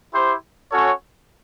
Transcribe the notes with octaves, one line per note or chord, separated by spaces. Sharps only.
E4 G4 C5
C#4 F#4 A4 C#5